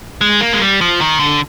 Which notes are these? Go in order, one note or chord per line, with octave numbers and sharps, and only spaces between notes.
G#3
A#3
G#3
G3
F3
D#3
D3